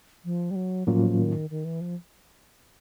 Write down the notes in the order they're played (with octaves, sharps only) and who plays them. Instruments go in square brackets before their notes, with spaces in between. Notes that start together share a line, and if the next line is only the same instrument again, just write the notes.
[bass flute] F3
G3
F#3
[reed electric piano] A2 F#3 A#3 C#4 F4 [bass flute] F3
[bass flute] D#3
D#3
E3
F3